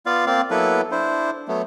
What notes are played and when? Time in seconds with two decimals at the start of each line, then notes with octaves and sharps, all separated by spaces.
0.06 B3 F4 D5 F5
0.26 A#3 C4 D5 F5
0.51 F#3 A#3 B3 E4 A4 B4
0.91 D4 E4 C5
1.48 F#3 A3 B3